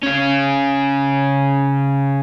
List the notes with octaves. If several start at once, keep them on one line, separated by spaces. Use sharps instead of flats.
C#3 C#4